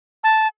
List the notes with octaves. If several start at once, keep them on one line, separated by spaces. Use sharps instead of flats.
A5